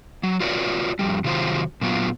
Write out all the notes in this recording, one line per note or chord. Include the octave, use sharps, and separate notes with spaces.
F#3
F4 F#4 B4 C#5 D5
F2 G3
C3 D#3 F#3 F4 C5
A#2 F#3 B3 F4